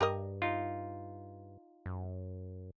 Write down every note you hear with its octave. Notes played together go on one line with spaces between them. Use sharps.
G2 G4 A#4 D#5
D#4 F4
F#2